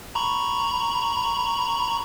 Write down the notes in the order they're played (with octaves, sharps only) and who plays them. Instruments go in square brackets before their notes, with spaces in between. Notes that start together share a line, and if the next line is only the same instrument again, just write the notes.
[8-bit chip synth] A#5 B5 C#6